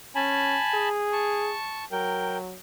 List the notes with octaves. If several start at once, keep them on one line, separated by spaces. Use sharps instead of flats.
C#4 G#5 A5 B5
G#4
A5 C#6
F#3 A#4 G5